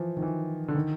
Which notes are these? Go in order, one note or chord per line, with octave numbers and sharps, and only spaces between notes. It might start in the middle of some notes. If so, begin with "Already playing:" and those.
Already playing: E3 F3
D#3
E3
D3
D#3